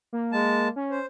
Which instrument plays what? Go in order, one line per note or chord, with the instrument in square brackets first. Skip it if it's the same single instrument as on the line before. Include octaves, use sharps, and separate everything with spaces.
[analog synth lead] A#3
[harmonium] G#3 A5
[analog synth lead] C#4
[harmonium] C5